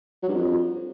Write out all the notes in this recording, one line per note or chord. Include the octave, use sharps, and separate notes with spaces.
F#3
G2
F2